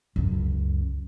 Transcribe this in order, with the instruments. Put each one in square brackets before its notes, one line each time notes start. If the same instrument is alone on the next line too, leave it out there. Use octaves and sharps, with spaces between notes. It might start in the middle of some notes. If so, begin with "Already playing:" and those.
[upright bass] C#2 F#2